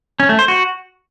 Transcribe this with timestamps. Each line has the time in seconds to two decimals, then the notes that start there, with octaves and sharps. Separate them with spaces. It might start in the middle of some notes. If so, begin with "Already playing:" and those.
0.20 C#4
0.29 A3
0.39 C5
0.48 F#4